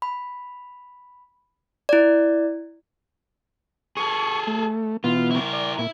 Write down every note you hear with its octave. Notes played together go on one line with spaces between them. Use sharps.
B5
E4 D5
G#4 A4 C#6
A3
B2 E3 B3 F4
E4 A#4
D5
A#2 E4